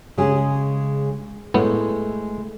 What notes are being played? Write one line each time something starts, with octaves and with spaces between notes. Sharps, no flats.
C#3 G#3 G#4
A2 G#3 A3 B3